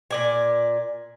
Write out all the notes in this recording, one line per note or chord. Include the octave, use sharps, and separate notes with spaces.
A#2 D5 G#5